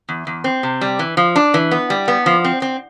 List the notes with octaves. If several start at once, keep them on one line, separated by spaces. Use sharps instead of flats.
E2
E2
C4
C3
G3
E3
F3
D4
E3
B3
G3
B3
F3
C4
C4